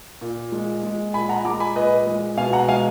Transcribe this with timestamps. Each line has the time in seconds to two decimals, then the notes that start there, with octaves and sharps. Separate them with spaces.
0.21 A#2
0.52 G#3
0.83 G#3
1.14 A#2 G#5 B5
1.29 F#5 A#5
1.45 G#3 A#5 D6
1.60 G#5 B5
1.75 A#2 B4 D#5
2.07 G#3
2.37 B2 F5 G#5
2.53 F#5 A#5
2.68 G#3 F5 G#5